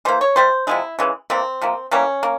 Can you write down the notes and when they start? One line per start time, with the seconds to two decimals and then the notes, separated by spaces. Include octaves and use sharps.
0.05 E3 A#3 C5
0.21 C#5
0.36 C3 G3 C5
0.67 C3 F3 G#3 E4
0.99 C#3 E3 G#3
1.30 C3 E3 G3 A#3 C4
1.61 C3 F3 A#3
1.91 E3 G3 A#3 C#4
2.23 A#3